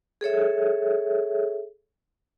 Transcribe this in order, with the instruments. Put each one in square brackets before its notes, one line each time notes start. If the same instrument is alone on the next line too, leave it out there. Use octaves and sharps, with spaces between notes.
[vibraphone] G#4 A4 C#5 E5